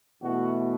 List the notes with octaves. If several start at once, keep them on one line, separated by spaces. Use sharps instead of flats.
E2 B2 A3 F#4